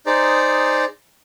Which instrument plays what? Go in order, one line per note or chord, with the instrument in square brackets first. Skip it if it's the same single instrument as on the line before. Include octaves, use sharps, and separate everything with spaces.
[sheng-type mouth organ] D#4 G#4 C5 D5 A#5